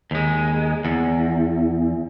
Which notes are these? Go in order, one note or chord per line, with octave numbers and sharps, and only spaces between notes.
D#2 G#3
E2